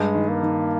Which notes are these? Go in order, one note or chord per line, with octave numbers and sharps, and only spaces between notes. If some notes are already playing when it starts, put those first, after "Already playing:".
Already playing: G2 G#3
D#3
A#3
D#3